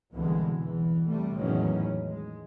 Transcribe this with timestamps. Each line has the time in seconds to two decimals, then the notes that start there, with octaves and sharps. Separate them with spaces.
0.13 C2 B2 D3 E3 G#3
0.58 E2 E3
1.06 C3 G3 A3
1.34 G#1 E2 A2 D#3 F#3 C#4
2.08 G#3